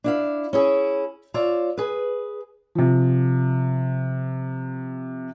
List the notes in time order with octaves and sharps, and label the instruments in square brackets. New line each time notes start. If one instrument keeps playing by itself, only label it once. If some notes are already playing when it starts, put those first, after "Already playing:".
[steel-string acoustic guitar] D4 E4 F5
C#4 E4 G#4
F4 C#5 D5 E5
G#4 B4
[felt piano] C3 F3